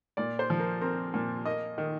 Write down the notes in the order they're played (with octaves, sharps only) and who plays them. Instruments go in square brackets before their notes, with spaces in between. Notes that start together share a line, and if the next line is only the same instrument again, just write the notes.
[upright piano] A#2 D5
C5
F3
A#4
C4 A#4
A#2
A#3 D#5
D#3